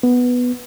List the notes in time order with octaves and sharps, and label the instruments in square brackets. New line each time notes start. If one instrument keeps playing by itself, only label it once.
[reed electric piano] B3